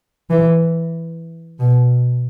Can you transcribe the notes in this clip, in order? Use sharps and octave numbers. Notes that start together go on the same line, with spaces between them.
E3
B2